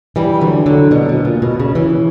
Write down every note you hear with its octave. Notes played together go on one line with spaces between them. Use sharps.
E3 G3
D3 F#3
D3 F#3
B2 D3
B2
A#2
B2
C#3
C#3 E3